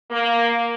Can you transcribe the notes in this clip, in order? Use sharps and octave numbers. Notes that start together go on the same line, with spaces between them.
A#3